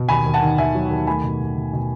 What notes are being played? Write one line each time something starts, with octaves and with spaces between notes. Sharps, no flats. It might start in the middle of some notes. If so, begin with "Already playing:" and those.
Already playing: B2
D#2 G#5 B5
D#2
F#5 A5
D#3
D#3 E5 G#5
F#3
D#2
A3 G#5 B5
B2
B2
B2
B2